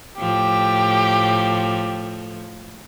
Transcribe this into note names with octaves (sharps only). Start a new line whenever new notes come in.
A2 F3 G4